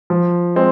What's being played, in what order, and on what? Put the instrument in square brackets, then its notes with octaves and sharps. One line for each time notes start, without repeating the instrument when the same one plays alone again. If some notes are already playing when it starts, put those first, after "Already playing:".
[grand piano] F3
G#3 C4